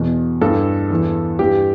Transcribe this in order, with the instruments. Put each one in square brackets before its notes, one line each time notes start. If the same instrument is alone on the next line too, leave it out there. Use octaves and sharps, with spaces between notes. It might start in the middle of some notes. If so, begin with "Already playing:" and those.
Already playing: [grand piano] E2 B2
G2 E3 A4
E2 E3
G2 E3 G4